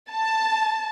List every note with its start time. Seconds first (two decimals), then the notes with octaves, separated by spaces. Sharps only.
0.11 A5